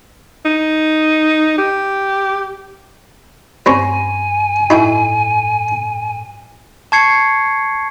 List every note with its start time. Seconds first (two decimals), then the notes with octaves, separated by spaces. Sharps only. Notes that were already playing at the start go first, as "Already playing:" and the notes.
0.45 D#4
1.58 G4
3.66 G2 G3 C4 C#4 G#5
4.70 A2 D#4 E4 G5
6.92 A5 C#6 G#6 C7 C#7